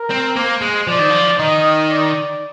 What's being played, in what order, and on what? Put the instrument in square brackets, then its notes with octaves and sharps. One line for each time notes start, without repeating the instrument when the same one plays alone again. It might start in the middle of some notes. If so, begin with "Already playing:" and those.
Already playing: [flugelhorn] A#4
[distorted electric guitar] C4
[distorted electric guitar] A#3 [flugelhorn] C5
[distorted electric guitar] G#3
[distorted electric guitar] F3 [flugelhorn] D5
[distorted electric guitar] D#3
F3
[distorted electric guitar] D#3 [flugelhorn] D#5
[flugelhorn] D5